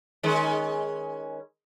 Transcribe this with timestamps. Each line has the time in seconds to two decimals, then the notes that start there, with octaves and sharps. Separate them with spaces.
0.23 D#3 G#3 C#4